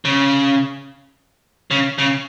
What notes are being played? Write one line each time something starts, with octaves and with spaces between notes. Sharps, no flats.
C#3
C#3
C#3